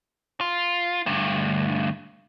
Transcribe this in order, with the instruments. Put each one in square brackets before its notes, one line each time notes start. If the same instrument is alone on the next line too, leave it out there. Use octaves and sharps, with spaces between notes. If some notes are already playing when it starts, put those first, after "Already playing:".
[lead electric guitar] F4
D2 G2